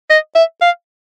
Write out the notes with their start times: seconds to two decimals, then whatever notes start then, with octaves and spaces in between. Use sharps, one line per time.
0.10 D#5
0.35 E5
0.62 F5